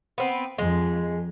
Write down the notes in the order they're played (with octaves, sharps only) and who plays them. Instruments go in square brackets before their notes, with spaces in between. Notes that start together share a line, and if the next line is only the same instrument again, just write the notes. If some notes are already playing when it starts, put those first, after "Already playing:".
[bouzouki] B3 C4
[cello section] F2 [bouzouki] G#3